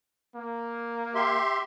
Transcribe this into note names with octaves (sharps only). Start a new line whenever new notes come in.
A#3
G4 E5 C6